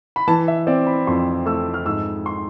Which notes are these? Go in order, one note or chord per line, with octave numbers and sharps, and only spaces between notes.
B5
E3 A5
E5
C4 D5
B5
F2 C6
A3 E6
F6
G#2 E6
C6